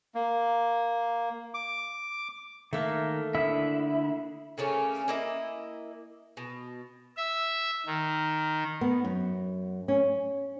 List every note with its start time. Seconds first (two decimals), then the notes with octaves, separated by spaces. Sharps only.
0.15 A#3
1.54 D6
2.73 D#3 A3 A#3 A#4
3.35 D3 E4 E5 D#6
4.58 C#3 A3 A#3 C#4
5.08 A#3 E4 D#5
6.37 B2
7.17 E5
7.86 D#3
8.81 B3
9.04 F#2
9.88 C#4